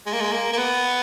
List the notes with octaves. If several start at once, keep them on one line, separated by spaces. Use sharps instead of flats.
G#3
A#3
G#3
A#3
A#3
B3